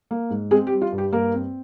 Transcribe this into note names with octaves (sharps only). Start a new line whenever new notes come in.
A#3
G#2
G#3 C4 G#4
G4
G3
F4
G2
G4
G2 A#3 A#4
C4